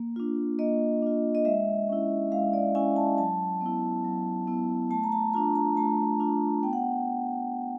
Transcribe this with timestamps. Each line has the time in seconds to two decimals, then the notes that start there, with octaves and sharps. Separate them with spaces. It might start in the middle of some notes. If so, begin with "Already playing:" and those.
Already playing: A#3
0.16 D4 F4
0.59 A#3 D#5
1.02 D4 F4
1.35 D#5
1.45 G#3 E5
1.89 C#4 E4
2.32 G#3 F5
2.53 D5
2.75 C#4 E4 G#5
2.96 A5
3.18 F#3 A5
3.61 B3 E4
4.04 F#3
4.47 B3 E4
4.91 A3 A5
5.04 A#5
5.12 A5
5.34 D4 F4 A#5
5.55 A#5
5.77 A3 A5
6.20 D4 F4
6.63 B3 G5
6.73 F#5